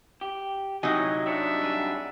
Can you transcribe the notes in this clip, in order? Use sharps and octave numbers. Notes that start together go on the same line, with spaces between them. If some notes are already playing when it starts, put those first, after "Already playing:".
G4
C3 F#3 D#4 E4 D#5 G#5
C2 G3 D4 C#5 E5
G3 F#4 G#4